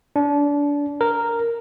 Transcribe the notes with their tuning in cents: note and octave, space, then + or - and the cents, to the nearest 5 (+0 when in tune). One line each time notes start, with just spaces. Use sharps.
D4 -25
A#4 -5